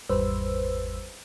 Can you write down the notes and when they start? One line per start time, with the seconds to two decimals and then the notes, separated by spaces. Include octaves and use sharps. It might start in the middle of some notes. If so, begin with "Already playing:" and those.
0.09 G#1 E2 G3 B4 C5 E6